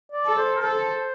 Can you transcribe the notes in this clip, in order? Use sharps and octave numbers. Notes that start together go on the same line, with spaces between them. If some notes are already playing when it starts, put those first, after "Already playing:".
D5
A4
C5
A#4
A4 C5